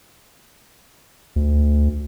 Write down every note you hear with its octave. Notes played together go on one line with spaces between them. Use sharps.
D2